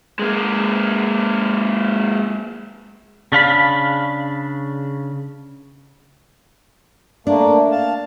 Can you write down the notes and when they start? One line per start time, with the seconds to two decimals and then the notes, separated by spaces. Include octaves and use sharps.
0.19 G#3 A#3
3.32 C#3 D4 F5 B5
7.27 A3 A#3 D4
7.71 F5 A5